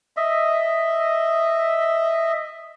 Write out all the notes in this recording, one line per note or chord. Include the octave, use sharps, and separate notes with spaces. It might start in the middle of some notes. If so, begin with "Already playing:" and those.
D#5 E5